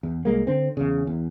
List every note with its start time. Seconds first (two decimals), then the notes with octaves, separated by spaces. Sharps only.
0.03 E2
0.25 C2 G#3 A#3
0.47 D3 C4
0.77 E2 C#3
1.07 E2